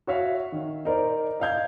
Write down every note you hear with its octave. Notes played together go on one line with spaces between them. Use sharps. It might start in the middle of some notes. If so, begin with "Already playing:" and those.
F#4 C#5 E5 F5
D#3
D#4 A#4 C5 D5
D#5 F5 G6 G#6